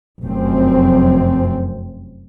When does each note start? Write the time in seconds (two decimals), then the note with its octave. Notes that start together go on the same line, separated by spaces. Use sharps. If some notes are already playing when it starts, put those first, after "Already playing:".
0.23 F1 F#2 C4